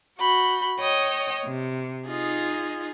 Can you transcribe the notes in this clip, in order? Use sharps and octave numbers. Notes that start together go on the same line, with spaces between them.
F#4 B5 G6
C#5 D#5 G5 D#6
C3
D#4 F4 G#4 D#5